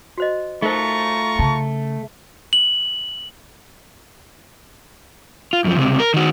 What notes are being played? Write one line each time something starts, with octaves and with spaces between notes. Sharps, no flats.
F#4 C5 D#5
A3 D#4 F4 A#4 C5 A#5 C#6
C#3 A5
F#7
F4
F#2 F3
C#2 C3
A#4
D#3 F#4